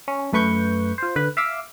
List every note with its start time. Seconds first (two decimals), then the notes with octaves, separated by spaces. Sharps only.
0.08 C#4
0.32 F#2 A3 B4 C#6 G6
0.98 F4 C5
1.16 D3 B4 F#6
1.37 E5 F5 D6 E6